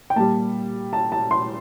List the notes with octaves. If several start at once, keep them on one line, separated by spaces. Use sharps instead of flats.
G5
A#2 G3 A5
A5
A5
C6